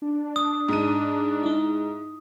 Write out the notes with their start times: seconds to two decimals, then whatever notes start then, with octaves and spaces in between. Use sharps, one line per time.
0.02 D4
0.36 D#6
0.68 G#2 D#7
1.43 D#4 E4